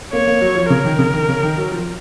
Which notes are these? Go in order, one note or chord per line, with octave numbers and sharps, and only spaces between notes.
A#3 C#5
A#3
F#3
F3
C#3 A#4
D#3
C#3
D#3
C#3
D#3
F#3
F3